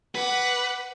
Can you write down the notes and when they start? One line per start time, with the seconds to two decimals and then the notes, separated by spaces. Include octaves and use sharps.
0.15 B4 F#5 D6